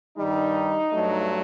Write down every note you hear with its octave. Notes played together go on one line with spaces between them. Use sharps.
G2 D#3 G3 D#4
G2 F#3 A3